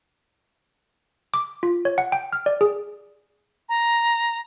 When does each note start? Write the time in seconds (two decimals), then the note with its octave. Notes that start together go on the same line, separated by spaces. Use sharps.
1.34 D6
1.63 F4
1.85 C#5
1.98 F#5
2.12 G5
2.33 F6
2.46 D5
2.61 G#4
3.69 A#5